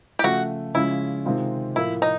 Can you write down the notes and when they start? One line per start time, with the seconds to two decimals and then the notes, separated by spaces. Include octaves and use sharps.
0.19 G4
0.24 C#3 F3 A3 F#4
0.74 C#3 F3 G#3 C#4 E4
1.25 C3 D#3 G#3 C4 F4
1.76 A2 F3 A#3 E4
2.02 D#4